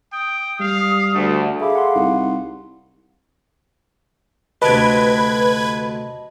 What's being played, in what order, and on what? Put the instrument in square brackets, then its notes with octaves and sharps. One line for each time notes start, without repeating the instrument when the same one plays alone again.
[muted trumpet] G5 [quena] D#6
[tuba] G3 [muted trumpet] F5
[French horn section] D2 [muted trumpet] A3
[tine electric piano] G#4 A4 [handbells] E5 B5 D6 [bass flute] F5
[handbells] F#5 C6
[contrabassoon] C2 [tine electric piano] D#4
[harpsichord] D2 C3 G4 [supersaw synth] B4 G#6 [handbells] D#5 A5 B5